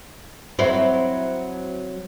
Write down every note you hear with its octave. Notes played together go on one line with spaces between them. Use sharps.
F#3 C4 E4